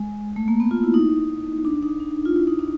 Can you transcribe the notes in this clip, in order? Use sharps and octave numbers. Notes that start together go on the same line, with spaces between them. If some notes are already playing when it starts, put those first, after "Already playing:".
Already playing: G#3
A3
A#3
B3
F4
E4
D#4
D4
D#4
D4
F4
E4
D#4
D4